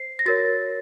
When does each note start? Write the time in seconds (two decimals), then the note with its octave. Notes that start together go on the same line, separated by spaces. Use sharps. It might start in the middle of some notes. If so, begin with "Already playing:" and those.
Already playing: C5 C7
0.19 A#6
0.26 F#4 A#4 C#5 A6